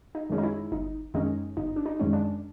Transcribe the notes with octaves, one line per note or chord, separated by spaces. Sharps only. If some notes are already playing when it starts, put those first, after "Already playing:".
D#4
F#2 D#3 G#3 C#4
D#4
E4
G1 D#4
F#2 D#3 G#3 C#4 D#4
G1 D#4
D4
D#4
F#2 D#3 G#3 C#4
D4